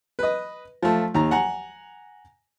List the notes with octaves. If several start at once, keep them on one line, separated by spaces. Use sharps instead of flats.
B4 D#5
F3 A3
D#2 A#5
F#5 G#5 A#5